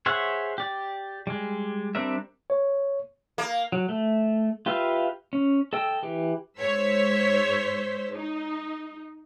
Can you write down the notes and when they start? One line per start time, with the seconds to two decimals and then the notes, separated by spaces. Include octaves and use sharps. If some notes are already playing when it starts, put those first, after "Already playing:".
0.06 G#4 C5 C#5 E5 F#5
0.58 G4 D5
1.27 G3 G#3
1.95 G3 C4 D4 A#4 E5
2.50 C#5
3.38 A#3
3.72 F#3
3.89 A3
4.66 F4 G4 B4 E5 F5
5.33 C#4
5.73 A4 D#5 G5 E6
6.03 E3 G4
6.59 G#2 C5 C#5 E6 B6
8.11 D#4